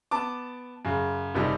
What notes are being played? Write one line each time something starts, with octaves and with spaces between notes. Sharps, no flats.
B3 A5 D6
F#2 C#3
F#1 C3 G3 D#4